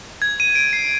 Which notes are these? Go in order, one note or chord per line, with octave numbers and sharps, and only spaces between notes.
G#6
D#7
D7
C7